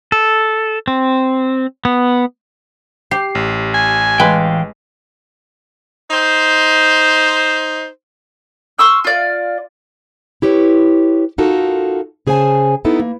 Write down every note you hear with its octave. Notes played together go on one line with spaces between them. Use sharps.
A4
C4
B3
G4 C7
A1
G#5
E3 G#3 B4 F5 G5
D#4 C5
C6 C#6 E6 F6
F4 D5
E4 G4 B4 C#5
D#4 F4 F#4 A4 A#4
C#3 G#4 C5 F#5 G#5 A5
B3 D#4 E4 A4
A#3